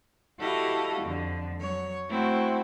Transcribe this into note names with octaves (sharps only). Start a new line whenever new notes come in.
E4 F#4 G4 A4 D#5 F5
F2 D3
F#3 C#5
A3 C4 E4 F#4